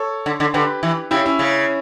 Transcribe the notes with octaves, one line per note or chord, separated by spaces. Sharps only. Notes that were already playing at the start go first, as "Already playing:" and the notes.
Already playing: A4 C#5
D3
D3
D3 G4 B4
E3
C#3 E4 G4
C#4 E4
C#3